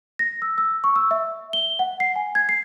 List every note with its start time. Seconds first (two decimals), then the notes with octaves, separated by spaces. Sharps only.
0.19 A#6
0.42 E6
0.58 E6
0.84 C#6
0.96 E6
1.11 E5
1.53 G7
1.79 F#5
2.00 C7
2.16 G#5
2.35 G#6
2.49 C7